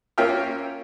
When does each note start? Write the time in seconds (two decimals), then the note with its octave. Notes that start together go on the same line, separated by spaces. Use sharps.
0.18 A#3 C#4 F4 E5 G5 F6